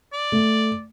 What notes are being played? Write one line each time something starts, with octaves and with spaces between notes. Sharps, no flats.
D5
A3